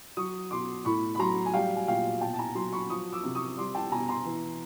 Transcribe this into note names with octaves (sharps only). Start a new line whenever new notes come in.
F#3 C#6 D#6
B2 C6 D6
A2 B5 C#6
B5
F#3 A#5 C6
G#5
G3 F5 G5
G#5
A#2 F5 G5
B2 G5 A5
A5
G#5 A#5
F#3 A#5 C6
B5 C#6
F3 C#6 D#6
D6 E6
C3
C#6 D#6
G3 C6 D6
G5 A5
B2 G#5 A#5
A#5 C6
E3